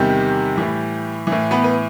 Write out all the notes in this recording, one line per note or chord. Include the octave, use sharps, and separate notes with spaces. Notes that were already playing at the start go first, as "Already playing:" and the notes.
Already playing: E2 C3 D#3 G3 G4
A2 E3
E3
A2
B3 B4
B4